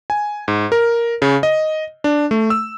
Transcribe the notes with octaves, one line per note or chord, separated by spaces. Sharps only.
G#5
G#2
A#4
C#3
D#5
D4
A3
E6